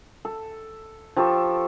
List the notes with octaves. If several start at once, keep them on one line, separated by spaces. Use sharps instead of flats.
A4
F3 G4 A4 C#6